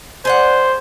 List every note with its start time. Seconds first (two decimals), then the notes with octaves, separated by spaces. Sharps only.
0.25 G#4 C5 D5 F#5